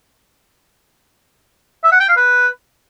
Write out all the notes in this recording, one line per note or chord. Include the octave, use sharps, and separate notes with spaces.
E5
F#5
G5
F5
B4